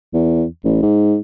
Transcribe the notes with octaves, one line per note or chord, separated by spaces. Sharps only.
E2
A1
G#2